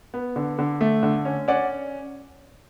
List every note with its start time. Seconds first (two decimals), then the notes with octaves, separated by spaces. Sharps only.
0.14 B3
0.36 D3
0.59 D3
0.81 A3
1.03 D3
1.25 C#4
1.48 C#4 D5 F#5